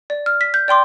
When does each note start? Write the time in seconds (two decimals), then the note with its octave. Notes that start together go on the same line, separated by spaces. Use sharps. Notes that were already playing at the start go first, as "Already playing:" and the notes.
0.10 D5
0.26 F6
0.41 B6
0.54 G6
0.68 D5 G5 C6 D6